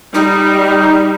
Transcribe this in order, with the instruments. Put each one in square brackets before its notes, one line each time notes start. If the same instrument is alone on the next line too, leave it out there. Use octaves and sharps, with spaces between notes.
[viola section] G3 [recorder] D#4